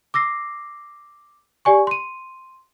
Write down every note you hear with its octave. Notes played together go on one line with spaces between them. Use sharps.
D6 E6 A#6 C7
G4 D5 G#5 C#6
C6 D#7